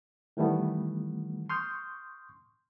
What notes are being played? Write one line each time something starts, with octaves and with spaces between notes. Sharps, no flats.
D#3 E3 G3 A3 B3
C6 C#6 D#6 F6 G6